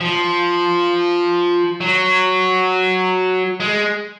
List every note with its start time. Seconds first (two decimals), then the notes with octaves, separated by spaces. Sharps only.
0.01 F3
1.81 F#3
3.60 G#3